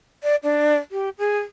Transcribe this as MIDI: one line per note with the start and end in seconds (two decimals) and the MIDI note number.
0.23 0.36 74
0.44 0.77 62
0.91 1.09 67
1.18 1.38 68